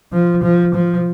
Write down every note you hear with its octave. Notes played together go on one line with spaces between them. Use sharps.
F3
F3
F3